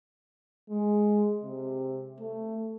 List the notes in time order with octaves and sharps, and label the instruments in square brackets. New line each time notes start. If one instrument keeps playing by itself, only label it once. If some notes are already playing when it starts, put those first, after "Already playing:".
[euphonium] G#3
C3
A3